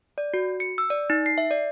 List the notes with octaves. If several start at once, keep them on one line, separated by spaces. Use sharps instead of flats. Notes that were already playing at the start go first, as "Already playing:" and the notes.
D5
F#4
C#7
E6
D5
D#4
C7
E5
D5